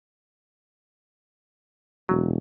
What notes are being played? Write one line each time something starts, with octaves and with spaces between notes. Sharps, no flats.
E1 F#3